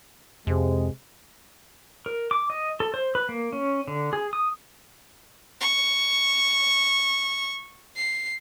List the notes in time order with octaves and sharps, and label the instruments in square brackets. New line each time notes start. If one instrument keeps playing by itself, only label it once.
[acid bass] F2 [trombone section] C3 G#3
[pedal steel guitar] A#4
D6
D#5
A4
C5
B4
A#3
C#4
D3
G#4
D#6
[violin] C#6
C7